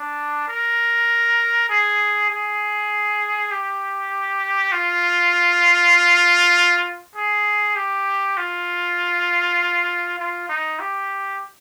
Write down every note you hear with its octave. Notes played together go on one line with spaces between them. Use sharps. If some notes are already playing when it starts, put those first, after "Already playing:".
Already playing: D4
A#4
G#4
G#4
G4
F4
G#4
G4
F4
F4
D#4
G4